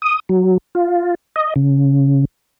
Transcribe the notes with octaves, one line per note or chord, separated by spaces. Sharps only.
D#6
F#3
F4
D#5
C#3